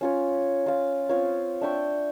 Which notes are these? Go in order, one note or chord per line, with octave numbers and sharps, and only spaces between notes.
C#4 F4 C#5
F4 F5
C4 F4 C#5
D4 E5 G5 C#6